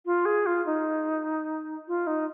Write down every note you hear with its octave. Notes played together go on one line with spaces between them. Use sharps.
F4
G#4
F4
D#4
F4
D#4